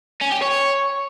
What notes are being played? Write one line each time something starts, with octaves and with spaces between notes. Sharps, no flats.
C#4
G4
C#5